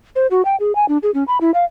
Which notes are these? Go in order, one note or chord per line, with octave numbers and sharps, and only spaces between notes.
C5
F#4
G5
G#4
G#5
D4
G#4
C#4
B5
E4
F5